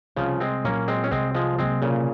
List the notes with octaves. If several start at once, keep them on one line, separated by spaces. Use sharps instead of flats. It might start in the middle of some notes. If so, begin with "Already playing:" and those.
C2 C#3 F3
G#3 C4
A#2 F#3 A#3 C#4
G#3 C4
C#4
C2 G#3 C4
F3 G#3
C3 F#3 G#3 A#3 C4
A#2 C#3